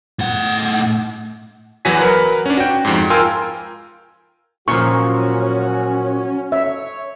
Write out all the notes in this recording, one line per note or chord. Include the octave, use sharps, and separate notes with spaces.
A2 F#5
E2 E3 F#3 F#4 G#5 B6
A#4 B4 F#5
C#4 D4
F#4 G5
F2 G#2
F4 A#4 G5 G#5 C6 E6
A#2 F3 F#3 C#4 F#4 C#6
C#5 E5